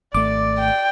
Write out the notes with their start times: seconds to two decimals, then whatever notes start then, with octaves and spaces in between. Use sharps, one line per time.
0.14 G#1 A3 D5 D6
0.59 G5